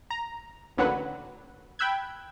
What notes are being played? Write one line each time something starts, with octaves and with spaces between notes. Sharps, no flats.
A#5
A1 D#2 D3 F#3 F#4 B4
G5 B5 E6 F#6 G#6